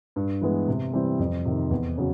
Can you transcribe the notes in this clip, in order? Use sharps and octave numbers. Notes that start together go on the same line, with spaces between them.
G2
E3 G#3 B3
C3
E3 G3 C4
F2
C3 D#3
E2
C#3 F#3